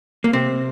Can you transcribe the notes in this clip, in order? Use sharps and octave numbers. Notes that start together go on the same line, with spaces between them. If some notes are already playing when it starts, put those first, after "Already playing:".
A#3
C3 C4